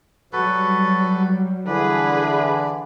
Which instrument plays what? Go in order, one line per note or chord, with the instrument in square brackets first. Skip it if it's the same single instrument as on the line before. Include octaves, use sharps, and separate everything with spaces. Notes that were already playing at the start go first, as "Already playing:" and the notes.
[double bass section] F#3 G3 [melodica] F#4 A4 B4
[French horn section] D3 E3 [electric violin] G#4 B4 [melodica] D5